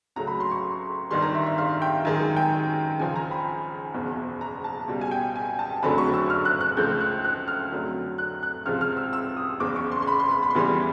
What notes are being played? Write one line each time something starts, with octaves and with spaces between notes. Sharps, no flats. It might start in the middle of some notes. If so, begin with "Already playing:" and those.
C#2 C#3 F#3 A3 A#5
B5
C6
C#6
G1 G2 D#3 G3 C6
A#5
E5
E5
F5
G5
F#2 D#3 G#3 G#5
G#5
G5
C#2 C#3 F3 G#5
A#5
B5
F#1 E2 B2
A#5
A5
C#2 B2 G3
G#5
G5
G#5
A5
F#1 F2 D3 F#3 A3 B5
C#6
E6
F6
F#6
F#6
C#2 C#3 F3 A3 G6
F#6
F#6
F6
F2 D3 F#3 A3
F#6
F#6
C#2 C3 F3 G#3 F6
F6
E6
E6
D#6
F#1 E2 C#3 D6
C#6
C6
C6
B5
C6
B5
B5
C6
E2 C#3 E3 G3 B5